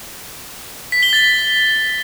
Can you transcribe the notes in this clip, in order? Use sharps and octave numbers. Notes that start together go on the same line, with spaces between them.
B6
G7
A6